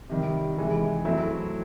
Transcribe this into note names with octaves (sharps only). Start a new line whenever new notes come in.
C3 D#3 G3
C3 E3 G#3
F#3 A3 C4 E4 A4